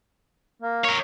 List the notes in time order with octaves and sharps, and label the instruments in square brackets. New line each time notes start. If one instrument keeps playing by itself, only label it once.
[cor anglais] A#3
[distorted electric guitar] A#4 C#5